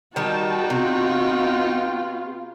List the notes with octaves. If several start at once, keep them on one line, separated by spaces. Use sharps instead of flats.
D#3 G3 D#4 F#4 G5 A5
C3 B3 F4